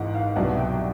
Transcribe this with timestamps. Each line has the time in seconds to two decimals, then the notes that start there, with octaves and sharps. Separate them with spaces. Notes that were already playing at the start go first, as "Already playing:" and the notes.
Already playing: G#1 G#2 E3 F#5
0.15 F5
0.36 C2 B2 F#3 B3 D4 F#5
0.57 G5